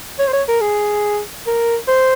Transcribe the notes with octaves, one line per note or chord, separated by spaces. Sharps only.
C#5
C5
C#5
A#4
G#4
A#4
C5